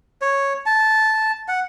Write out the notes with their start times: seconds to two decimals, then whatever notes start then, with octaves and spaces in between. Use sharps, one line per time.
0.22 C#5
0.66 A5
1.48 F#5